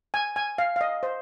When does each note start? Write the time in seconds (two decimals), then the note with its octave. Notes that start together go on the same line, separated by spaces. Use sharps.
0.14 G#5
0.36 G#5
0.58 F5
0.76 F5
0.81 D#5
1.03 C5